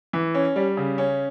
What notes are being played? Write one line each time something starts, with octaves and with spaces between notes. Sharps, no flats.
E3
C#4
G3
C#3
C#4